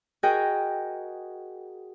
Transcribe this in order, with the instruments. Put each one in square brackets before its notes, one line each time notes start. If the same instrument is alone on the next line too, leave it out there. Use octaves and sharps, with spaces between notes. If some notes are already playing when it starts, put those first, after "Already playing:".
[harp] F#4 G#4 A#4 D#5 G5